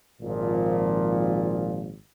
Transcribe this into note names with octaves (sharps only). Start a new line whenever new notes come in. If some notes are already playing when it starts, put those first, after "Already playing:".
G#1 A#2 F3